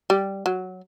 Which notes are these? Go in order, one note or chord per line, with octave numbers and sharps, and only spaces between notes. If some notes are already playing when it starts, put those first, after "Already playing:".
G3
F#3